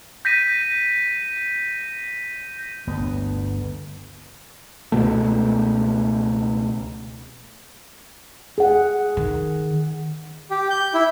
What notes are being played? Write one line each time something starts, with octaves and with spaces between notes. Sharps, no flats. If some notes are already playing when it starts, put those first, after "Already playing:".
G6 A#6 B6 D#7
G1 D2 B3
C#2 B2 A3
G#4 F#5
D#3
G4
G6
E4